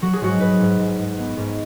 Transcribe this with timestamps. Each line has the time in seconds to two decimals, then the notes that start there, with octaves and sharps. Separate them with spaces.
0.02 F#3 F#4
0.13 G#4
0.21 G#2 F#4
0.40 G#2 B4
0.60 G#2
0.79 G#2
0.99 G#2
1.18 B3
1.37 G#2